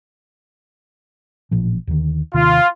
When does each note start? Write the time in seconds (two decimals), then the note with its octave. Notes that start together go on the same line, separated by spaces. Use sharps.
1.51 A1 A#2 F3
1.87 D#2 D3 D#3
2.34 D#2 C3 D#3 F4